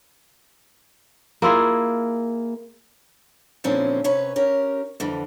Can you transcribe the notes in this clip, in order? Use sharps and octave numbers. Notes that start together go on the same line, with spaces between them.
A#3 E4 F4 G#4
A#2 D3 E3 F3 C4 C#4
C3 C#4 B4 C#5
C#4 G4 A#4
F2 D3 E3